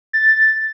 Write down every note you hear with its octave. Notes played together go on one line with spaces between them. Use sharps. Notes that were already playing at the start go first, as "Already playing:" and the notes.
A6